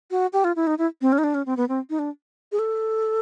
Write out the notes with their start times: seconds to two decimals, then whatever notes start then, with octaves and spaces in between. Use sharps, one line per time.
0.11 F#4
0.33 G4
0.44 F4
0.56 E4
0.67 D#4
0.78 E4
1.01 C4
1.12 C#4
1.18 D#4
1.24 D4
1.34 C#4
1.46 C4
1.57 B3
1.69 C4
1.90 D#4
1.99 D4
2.52 G#4
2.59 A4